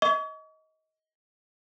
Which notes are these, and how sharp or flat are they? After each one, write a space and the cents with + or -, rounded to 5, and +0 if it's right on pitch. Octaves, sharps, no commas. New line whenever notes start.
D#5 +20 C#6 +40